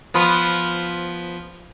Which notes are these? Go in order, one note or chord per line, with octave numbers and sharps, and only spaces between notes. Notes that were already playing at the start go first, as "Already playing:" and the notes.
F3 B3 F4